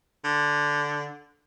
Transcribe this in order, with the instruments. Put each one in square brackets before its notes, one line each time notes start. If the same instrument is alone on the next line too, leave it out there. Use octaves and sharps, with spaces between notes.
[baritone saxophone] D3